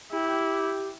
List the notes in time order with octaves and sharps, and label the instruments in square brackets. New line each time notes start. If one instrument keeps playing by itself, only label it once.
[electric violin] E4 [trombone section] G4